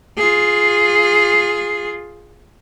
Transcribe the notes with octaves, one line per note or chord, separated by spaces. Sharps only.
F4 G#4